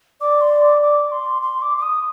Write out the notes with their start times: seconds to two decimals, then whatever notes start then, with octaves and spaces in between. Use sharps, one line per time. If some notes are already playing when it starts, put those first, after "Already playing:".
0.21 D5 D6
0.41 C6
0.62 D6
0.82 D6
1.12 C6
1.42 C6
1.62 D6
1.77 D6
1.82 D#6